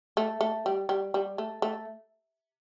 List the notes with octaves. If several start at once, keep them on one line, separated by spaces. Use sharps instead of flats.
A3
A3
G3
G3
G3
A3
A3